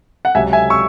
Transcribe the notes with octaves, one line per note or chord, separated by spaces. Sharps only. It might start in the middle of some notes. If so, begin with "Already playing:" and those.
F#5
C#2 C3 F#3 E5 G#5
E5 G#5
C#6 E6